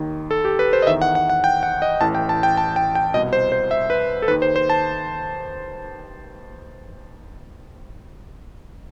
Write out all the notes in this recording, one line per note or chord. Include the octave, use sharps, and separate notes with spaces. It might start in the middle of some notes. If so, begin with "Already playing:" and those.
Already playing: D#2 D#3
A4
G4
B4
C5
D#5
E2 D#3 E5
F#5
F#5
F#5
G5
F#5
D#5
A1 A2 E3 A5
G5
A5
G5
A5
G5
G5
C2 B2 D#5
C5
C5
E5
B4
A4
D#2 D#3 B4
C5
C5
A5